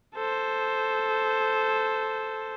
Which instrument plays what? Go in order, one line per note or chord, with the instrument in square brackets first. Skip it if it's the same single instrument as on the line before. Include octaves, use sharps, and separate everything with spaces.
[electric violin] A4 C5